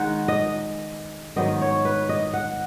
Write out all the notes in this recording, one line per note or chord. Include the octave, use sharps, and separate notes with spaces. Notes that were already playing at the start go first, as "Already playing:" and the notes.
Already playing: D#3 G#3 D#4 F#5
D#5
G#2 D#3 F#3 B3 D#5
C#5
B4
D#5
F#5